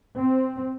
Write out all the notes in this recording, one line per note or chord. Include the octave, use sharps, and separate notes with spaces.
C4